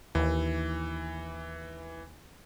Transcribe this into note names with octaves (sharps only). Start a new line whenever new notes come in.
D#2 E3